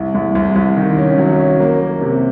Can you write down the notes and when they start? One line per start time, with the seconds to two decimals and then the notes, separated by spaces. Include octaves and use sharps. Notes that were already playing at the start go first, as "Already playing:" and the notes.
Already playing: C2
0.15 C2
0.35 C2
0.56 C2
0.77 D#3
0.98 C#4
1.18 F#3
1.39 C#4
1.60 A#3
1.80 A#3
2.01 C3